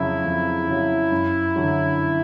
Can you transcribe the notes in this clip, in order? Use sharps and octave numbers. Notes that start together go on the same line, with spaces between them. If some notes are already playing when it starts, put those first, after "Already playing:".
Already playing: F2 C#3 F#3 E4
F2
C#3 F#3
F#2
D3 F#3